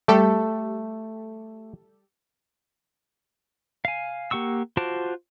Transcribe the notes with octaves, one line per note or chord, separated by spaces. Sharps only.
G3 A3 G4 A4
F5 G#5
A#3 G4 F#5 C#6 E6
F4 F#4 C5 A5 D6